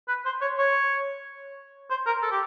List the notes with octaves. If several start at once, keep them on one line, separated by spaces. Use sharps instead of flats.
B4
C5
C#5
C#5
C5
A#4
A4
G4